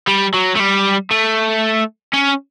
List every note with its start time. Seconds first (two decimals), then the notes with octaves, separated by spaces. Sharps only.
0.08 G3
0.34 F#3
0.55 A3
0.59 G3
1.11 A3
2.13 C#4